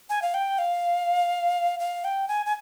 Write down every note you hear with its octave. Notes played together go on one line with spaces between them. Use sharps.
G#5
F5
G5
F5
F5
G5
G#5
G#5